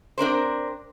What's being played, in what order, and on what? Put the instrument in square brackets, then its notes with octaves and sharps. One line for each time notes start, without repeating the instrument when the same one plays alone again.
[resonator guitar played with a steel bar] C4 D4 A#4 C5